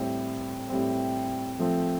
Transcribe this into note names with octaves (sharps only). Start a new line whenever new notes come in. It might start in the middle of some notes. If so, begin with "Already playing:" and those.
Already playing: A2 G3 C4
A2 G3 C4
F3 A3 C4